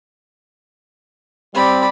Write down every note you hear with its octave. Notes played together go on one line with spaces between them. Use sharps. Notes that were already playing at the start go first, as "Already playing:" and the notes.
G3 C4 D5 B5